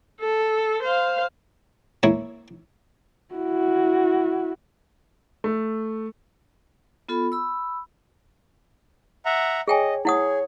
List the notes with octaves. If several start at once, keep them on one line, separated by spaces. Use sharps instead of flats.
A4
C5 F5
A#3 E4 C#5
E4 F#4
A3
B3 F4 A4 B5
B5 E6
E5 F#5 A#5
G#4 C#5 D#5 G5 G#5
E4 G#4 C#5 F#5 D#6